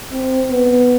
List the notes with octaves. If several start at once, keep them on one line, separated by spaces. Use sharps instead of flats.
C4
B3